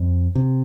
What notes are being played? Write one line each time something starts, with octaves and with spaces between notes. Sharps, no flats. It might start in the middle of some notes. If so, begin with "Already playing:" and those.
Already playing: F2
C3